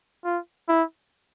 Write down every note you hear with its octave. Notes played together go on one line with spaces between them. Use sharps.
F4
E4